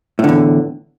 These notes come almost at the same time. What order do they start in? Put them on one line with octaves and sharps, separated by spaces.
A2 D3 E2